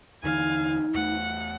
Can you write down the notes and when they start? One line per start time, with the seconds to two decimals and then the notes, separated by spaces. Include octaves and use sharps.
0.24 D#2 D3 E3 D#4 F5 G#5
0.94 E2 A3 F#5